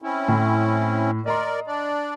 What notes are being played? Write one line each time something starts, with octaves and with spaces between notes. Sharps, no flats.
C4 C#4 E4
A2
A#4 D5 D#5 A#5 C6
D4 D5